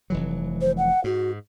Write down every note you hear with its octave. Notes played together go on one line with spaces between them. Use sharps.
F1 E3 F#3
C5
F#5
G#2 F#4